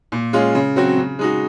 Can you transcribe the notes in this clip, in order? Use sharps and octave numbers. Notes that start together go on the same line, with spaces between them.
A#2
G#3 C#4 F4
C#3
F#3 C4 F#4
C#3
G#3 D#4 F#4